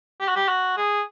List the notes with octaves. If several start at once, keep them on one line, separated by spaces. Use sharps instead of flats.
G4
F#4
G4
F#4
G#4